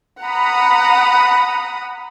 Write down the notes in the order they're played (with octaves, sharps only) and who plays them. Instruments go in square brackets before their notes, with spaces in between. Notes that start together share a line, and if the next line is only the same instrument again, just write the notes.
[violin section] F#5 A#5 B5 D#6